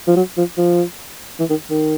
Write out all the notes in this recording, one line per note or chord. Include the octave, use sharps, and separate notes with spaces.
F3
F#3
F3
F3
E3
D#3
D#3